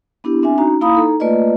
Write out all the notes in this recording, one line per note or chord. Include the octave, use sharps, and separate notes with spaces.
B3 D4 E4 G4
C4 D4 E5 G#5
C#4 D#4 F#4 A#5
A#3 E4 F5 A#5 B5 D#6
D#4 A4 A#5
A3 A#3 F4 B4 D5 D#5